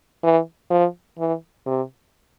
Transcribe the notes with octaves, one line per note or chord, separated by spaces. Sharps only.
E3
F3
E3
C3